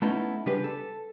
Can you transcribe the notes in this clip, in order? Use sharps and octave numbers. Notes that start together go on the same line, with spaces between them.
A3 B3 C#4 D#4 E4
C#3 G3 D4 G4 B4
A4